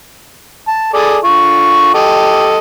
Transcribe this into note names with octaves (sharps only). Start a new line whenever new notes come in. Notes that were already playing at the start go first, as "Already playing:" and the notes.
A5
G#4 A4 D5
D3 F4 C#6
G4 A4 D#5